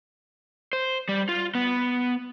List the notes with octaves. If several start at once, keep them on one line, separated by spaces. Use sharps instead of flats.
C5
G3
F4
B3